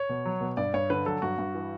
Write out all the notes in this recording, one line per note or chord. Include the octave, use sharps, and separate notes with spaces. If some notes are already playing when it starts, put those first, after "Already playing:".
Already playing: C#5
B2
F#3
B2
G2 D5
G2 C#5
D3 B4
F#3 A4
G2 F#4
G2
E3